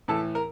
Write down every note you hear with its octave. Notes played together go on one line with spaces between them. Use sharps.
A2 E3 A4
A#4